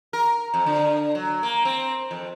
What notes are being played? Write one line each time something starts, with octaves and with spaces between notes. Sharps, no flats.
A#4
F2
D3
F#3
A#3
C4
F2